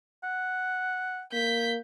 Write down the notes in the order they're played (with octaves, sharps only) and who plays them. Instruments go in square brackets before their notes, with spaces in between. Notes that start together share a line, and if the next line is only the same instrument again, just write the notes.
[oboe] F#5
[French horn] A#3 [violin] G6 B6